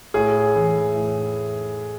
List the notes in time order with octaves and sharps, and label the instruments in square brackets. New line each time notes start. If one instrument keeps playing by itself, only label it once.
[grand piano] A2 G#4
E3
A2